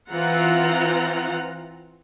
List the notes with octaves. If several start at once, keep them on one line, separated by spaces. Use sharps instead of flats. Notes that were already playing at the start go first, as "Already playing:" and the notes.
E3 C4 F4 F#5 A#5